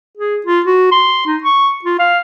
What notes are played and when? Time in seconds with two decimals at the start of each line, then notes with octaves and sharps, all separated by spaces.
0.17 G#4
0.46 F4
0.66 F#4
0.91 C6
1.26 D#4
1.44 C#6
1.84 F4
1.99 F5